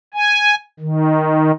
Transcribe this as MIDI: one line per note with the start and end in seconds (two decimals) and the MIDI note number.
0.14 0.55 80
0.80 1.51 51